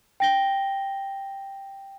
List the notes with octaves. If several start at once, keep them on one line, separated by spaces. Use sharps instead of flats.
G5 A#6 G7